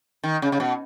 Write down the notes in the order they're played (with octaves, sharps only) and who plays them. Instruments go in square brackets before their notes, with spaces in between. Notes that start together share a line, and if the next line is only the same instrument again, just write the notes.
[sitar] D#3
C#3
C#3
B2